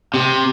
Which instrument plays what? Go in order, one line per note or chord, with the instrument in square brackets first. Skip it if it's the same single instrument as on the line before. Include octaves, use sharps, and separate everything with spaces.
[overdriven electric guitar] C3